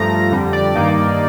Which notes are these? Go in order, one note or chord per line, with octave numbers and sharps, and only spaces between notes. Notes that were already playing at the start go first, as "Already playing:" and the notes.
Already playing: G2 F3 A3 A#5
F2 D3 G3
D5
G2 D#3 A#3 D#4